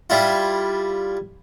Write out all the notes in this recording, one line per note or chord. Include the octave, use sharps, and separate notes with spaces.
G3 E4 F4